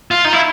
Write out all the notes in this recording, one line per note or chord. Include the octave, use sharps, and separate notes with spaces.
F4
D#4
E4